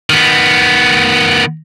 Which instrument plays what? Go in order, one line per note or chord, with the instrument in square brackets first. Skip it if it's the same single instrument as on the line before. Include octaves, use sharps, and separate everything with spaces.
[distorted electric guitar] D#3 B3